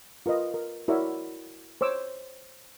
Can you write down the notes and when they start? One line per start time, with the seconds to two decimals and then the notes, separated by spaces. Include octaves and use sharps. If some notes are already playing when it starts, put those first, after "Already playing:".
0.26 F4 A#4 B4 D#5
0.54 A#4
0.88 E4 F#4 A#4 C#5 D5 E5
1.81 C5 C#5 D6 E6